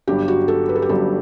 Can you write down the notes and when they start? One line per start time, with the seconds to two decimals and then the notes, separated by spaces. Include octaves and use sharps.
0.07 G1 G2 F#3 G4
0.28 F#4
0.48 A4
0.69 B4
0.75 A4
0.82 G4
0.89 G1 G2 F#3 A4